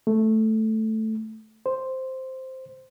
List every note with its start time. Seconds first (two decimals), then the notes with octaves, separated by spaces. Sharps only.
0.07 A3
1.66 C5